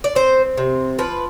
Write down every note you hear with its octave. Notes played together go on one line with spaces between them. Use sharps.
D5
C4 C5
C3
F3 B4